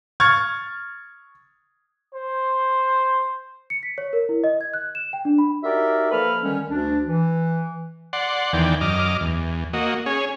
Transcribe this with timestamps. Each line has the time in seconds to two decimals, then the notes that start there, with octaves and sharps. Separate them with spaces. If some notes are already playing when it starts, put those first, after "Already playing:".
0.20 C#6 F6 G#6 A6
2.13 C5
3.70 C#7
3.83 B6
3.98 C#5
4.13 A#4
4.29 E4
4.44 D#5
4.61 G#6
4.74 F#6
4.95 E7
5.13 G5
5.25 D4
5.38 B5
5.63 D#4 F#4 G4 A#4 D5 E5
6.11 F3 A#3 A4 B4 B5 F6
6.43 D3 D#3 G3 G#3 C#4
6.70 D2 D4
7.07 E3
8.13 D5 F#5 C6
8.53 E2 D#3 E3 D5 G5
8.81 F#2 D#5 D6 F6
9.20 E2
9.73 A#3 F#4 D#5
10.06 C#4 G#4 C#5